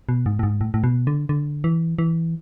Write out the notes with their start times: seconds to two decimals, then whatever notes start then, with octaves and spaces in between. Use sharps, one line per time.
0.09 B2
0.26 G#2
0.39 A2
0.43 G#2
0.61 A2
0.74 A2
0.84 B2
1.07 D3
1.29 D3
1.64 E3
1.99 E3